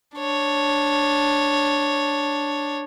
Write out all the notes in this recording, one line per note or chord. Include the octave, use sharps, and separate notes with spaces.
D4 C#5